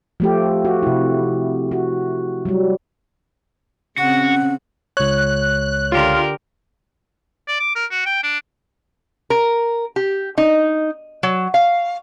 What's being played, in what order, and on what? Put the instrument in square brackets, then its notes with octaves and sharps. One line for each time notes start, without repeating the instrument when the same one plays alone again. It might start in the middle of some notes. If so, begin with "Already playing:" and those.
[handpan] F3 A3 G4
F#4
C3 E4
F#4
F#3 G3
[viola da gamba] C#3 C4 [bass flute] C#4 [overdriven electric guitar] F#4 [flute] F#5
[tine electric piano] C#2 C#5 [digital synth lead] F#6
[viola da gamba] D3 G4 A#4 [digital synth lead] F4
[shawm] D5
D6
A#4
F#4
G5
D4
[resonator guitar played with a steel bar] A#4
G4
D#4
F#3
F5